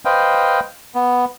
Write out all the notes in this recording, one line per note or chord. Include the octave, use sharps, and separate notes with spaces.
B4 C5 D#5 F5 G5
B3